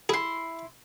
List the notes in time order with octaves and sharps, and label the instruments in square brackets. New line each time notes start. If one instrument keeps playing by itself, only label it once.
[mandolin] E4 C6 [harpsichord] G#4